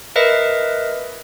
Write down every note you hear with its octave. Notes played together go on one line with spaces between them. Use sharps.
A#4 B4 D#5 E5